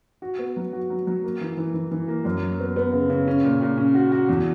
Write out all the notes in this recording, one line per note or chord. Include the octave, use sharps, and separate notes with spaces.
F#4
B3
F#3
F#4
F#3
F#3
A#3
E3
E3
E3
E3
A#3
F#2
F#3
B3
B3
C#3
C#3
C#4
A#2
A#2
C#4
F#4
F#4
E2